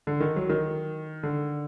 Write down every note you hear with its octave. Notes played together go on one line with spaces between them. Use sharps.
D3
D#3
F#3
D#3
D3